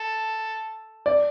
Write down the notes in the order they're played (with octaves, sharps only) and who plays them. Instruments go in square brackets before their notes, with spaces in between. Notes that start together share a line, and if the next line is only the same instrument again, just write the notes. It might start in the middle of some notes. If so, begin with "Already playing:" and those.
Already playing: [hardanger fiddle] A4
[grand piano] D5